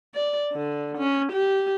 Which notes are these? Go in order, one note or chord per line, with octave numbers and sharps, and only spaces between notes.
D5
D3
C#4
G4